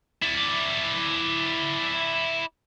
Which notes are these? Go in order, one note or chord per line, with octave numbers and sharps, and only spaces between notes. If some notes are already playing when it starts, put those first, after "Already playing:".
E4 D5